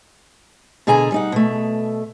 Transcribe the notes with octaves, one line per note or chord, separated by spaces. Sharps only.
B2 D3 G#4 G#5 A#5
G3 D#4 F#5
B2 A3